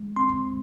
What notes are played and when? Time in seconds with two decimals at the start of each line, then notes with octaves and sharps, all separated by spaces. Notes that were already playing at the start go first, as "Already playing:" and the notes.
Already playing: G#3
0.16 C4 C6